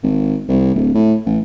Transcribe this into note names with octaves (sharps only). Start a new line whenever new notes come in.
G#1
C2
D1
A2
A1